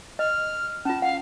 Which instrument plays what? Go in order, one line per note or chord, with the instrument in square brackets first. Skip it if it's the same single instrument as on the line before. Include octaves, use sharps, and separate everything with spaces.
[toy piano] D#5 [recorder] F6
[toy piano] C#4 F4 [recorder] A5
[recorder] F5 [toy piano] F#5